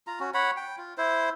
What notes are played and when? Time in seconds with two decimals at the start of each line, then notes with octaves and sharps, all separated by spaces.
0.07 F4 A#5
0.20 C#4 F#4
0.34 C#5 F#5 B5
0.57 G5
0.78 F4
0.97 E4 C5